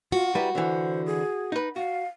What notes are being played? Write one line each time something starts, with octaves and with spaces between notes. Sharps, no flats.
F4 F#4
G3 E4 B4 A#5
D3 E3 C5
G#4
D#4 B4
F#4 F5